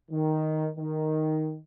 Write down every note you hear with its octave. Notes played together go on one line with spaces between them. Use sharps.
D#3
D#3